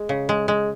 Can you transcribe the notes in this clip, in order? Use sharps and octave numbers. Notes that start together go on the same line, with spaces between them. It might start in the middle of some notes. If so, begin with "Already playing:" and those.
Already playing: G#3
C#3
G#3
G#3